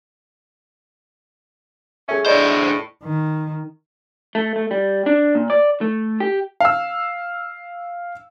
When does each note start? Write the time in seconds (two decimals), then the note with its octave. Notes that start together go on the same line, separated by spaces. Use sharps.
2.09 C#4 G#4 A4 E5
2.26 A2 D3 C5 D5 D#5
3.03 D#3
4.35 A3
4.56 A3
4.71 G3
5.06 D4
5.35 A#2
5.50 D5
5.81 A3
6.20 G4
6.60 F5 E6